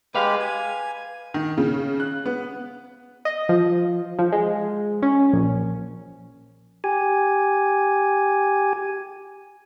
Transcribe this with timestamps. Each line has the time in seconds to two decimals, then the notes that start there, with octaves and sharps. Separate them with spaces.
0.15 G#3 G4 B4 F5 B5
0.40 G#5
1.34 D#3
1.58 C#3
2.00 F#6
2.26 B3
3.25 D#5
3.49 F3
4.19 F3
4.32 G#3
5.02 C#4
5.33 A#1
6.84 G4 G#5